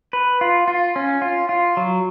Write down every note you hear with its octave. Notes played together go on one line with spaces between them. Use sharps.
B4
F4
F4
C#4
F4
F4
F#3